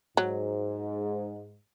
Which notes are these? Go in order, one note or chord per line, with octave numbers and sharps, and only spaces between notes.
G#2 F#3